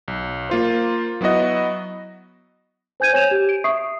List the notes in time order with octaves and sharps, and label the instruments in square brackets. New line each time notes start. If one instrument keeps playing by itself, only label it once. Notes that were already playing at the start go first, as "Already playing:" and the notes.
[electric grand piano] B1
A#3 F4 C5
F#3 B3 E4 F#4 D#5
[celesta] C5 G#5 G6 G#6 D#7
C#5 G#5 G6 G#6 E7 F7
G4
D7
E5 C#6 D#6 C7